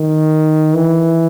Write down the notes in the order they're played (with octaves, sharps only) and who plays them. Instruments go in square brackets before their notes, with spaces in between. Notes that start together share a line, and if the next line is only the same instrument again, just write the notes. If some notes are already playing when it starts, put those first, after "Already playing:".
Already playing: [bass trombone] D#3
E3